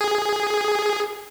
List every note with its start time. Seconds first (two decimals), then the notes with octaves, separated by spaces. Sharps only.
0.01 G#4